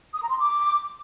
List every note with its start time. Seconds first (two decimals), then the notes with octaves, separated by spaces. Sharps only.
0.13 D#6
0.22 A#5
0.30 C6
0.38 D6